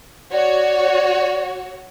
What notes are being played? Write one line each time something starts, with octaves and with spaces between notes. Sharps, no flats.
F#4 C#5 D5